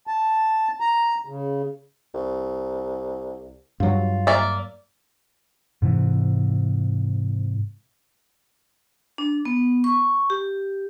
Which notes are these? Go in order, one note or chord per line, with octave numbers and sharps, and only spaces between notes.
A5
A#5
C#3
C2
G2 F#3 F4
A#3 D5 E5
G#2 C3 E3
D4
B3
C#6
G4